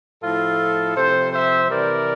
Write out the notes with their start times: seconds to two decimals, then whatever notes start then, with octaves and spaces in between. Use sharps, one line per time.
0.23 A2 F3 F4 A4
0.96 C3 F3 A4 C5
1.33 C5 E5
1.69 C3 E3 G3 A#4 D5